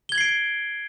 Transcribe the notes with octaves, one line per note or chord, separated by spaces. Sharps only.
G#6 C7 D7 F#7 G7